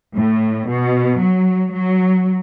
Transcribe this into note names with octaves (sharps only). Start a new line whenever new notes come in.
A2
B2
F#3
F#3